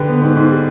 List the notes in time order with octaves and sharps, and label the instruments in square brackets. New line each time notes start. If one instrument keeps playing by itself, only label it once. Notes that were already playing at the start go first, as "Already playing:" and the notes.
Already playing: [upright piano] D3 G4 B4
B3
G#2
G#2
G3